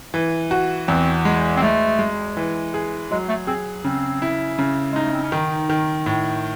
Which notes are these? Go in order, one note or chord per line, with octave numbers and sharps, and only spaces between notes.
E3
F#4
E2 C4
G#3
C4
G#3 A3
G#3
E3
G#4
F#3 G#3
A3
C4 G#4
C#3 C4
E4
C#3
G#3 D#4
A3
C4
C#4
D#3 D#4
D#3
A2